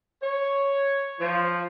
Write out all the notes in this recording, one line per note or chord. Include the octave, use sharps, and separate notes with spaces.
C#5
F3